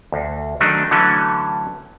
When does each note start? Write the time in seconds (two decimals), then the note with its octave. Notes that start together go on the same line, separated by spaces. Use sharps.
0.12 D2
0.61 D#3 F#3 A3 D4 D#4
0.91 D3 E3 F#3 A3 C#4